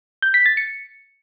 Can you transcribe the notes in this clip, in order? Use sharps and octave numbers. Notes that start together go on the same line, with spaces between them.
G6
B6
A6
C#7